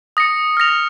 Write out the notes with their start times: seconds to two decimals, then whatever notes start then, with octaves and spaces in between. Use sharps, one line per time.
0.17 D#6 A#6 C#7
0.57 F6 A#6 F7